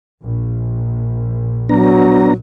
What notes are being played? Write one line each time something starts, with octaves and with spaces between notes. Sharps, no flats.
A#1
F#3 B3 D4 A#5